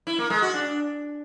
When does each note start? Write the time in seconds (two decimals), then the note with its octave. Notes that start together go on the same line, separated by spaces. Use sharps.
0.07 E4
0.18 A#3
0.30 G#3
0.42 F#4
0.54 D4